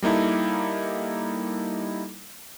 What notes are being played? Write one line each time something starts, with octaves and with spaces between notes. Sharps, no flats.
G3 A#3 D#4 E4 A4